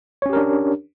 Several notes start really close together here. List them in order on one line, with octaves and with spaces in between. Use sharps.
C#5 C#4 G4 A#4 D4